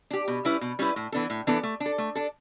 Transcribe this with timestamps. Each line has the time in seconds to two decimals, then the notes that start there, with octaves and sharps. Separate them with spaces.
0.11 D4 G4
0.28 B2
0.45 G3 C#4 E4 B4
0.61 B2
0.79 G3 C#4 E4 B4
0.96 A2
1.12 E3 B3 D4 A4
1.30 A2
1.47 E3 B3 D4 A4
1.63 A3
1.80 D4
1.86 A4
1.98 A3
2.15 D4 A4